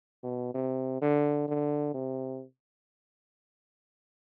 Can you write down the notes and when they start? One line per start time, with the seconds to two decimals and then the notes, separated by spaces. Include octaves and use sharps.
0.23 B2
0.54 C3
1.01 D3
1.48 D3
1.94 C3